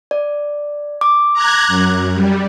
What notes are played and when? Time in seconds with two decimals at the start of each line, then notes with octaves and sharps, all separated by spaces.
0.11 D5
1.01 D6
1.33 A#5 F#6 G#6
1.67 F#2
2.14 G3